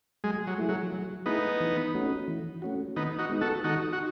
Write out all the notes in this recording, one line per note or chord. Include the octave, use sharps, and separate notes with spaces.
F#3 G#3
F#3
A3 E4 G#4
F#3
F#3
A3 B3 D#4 E4 G#4
E3
A3 C#4 F#4
E3
A3 C#4 F#4
D#3 B3 D#4
D#4 F#4
G#3 B3 D#4
F#4 A4
D#3 D#4 F#4
F#4